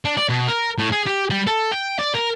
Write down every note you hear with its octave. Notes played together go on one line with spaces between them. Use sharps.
D4
D5
B2
A#4
A2
G#4
G4
G3
A4
G5
D5
A#4